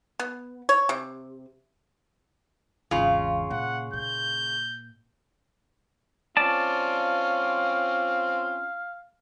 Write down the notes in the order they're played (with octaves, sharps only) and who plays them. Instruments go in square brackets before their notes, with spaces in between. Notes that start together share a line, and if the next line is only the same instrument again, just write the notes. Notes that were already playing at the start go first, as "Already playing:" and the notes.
[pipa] B3
C#5
C3
[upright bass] G#1 E2 [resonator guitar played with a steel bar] C#3 F4
[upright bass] A#2 [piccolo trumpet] F#5
[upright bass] A#2 [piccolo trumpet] G6
[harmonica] C4 C#4 F4 [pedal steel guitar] D5 A5 [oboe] F5